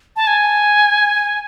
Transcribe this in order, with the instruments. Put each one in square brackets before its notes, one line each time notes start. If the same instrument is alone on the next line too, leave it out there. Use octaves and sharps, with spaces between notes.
[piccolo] A5
G#5